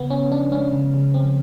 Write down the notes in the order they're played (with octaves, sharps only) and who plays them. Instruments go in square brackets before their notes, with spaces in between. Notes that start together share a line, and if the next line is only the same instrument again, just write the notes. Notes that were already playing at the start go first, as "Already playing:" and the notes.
Already playing: [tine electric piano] C#3 [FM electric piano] B3
[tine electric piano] C#3 [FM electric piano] C#4
[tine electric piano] F3 [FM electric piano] D4
[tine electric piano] G#3 [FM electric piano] C#4
[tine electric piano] C#3
C#3
[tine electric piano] F3 [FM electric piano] C4